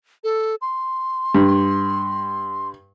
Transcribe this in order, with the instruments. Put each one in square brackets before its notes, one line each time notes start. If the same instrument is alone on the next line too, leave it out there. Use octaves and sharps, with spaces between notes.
[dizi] A4
C6
[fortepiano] G2